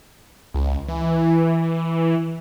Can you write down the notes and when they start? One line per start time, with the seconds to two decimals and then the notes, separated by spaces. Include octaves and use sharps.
0.54 C#2
0.88 E3